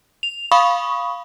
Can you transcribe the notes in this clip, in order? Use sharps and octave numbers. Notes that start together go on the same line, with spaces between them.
F7
F5 B5 C#6 D#6